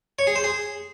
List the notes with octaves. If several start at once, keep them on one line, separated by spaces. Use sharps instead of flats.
C#5
G#4
C5
G#4